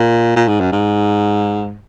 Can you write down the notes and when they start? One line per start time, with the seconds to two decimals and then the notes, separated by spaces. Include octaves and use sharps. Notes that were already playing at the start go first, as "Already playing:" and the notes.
Already playing: A#2
0.36 A#2
0.48 G#2
0.60 F#2
0.72 G#2